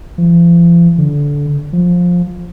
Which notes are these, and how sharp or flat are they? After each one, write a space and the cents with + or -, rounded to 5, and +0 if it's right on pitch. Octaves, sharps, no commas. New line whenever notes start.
F3 -40
D3 -20
F3 +15